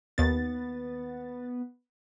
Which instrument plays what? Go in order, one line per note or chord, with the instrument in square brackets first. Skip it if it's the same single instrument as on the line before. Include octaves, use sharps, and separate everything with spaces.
[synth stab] D#2 A6 [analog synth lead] B3